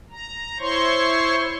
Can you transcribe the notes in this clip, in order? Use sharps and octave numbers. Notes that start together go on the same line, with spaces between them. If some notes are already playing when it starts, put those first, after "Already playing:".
A#5
E4 C5 C#5 C6 C#6